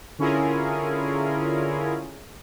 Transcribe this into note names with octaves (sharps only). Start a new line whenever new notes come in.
D3 C#4 E4 F4 G#4 A#4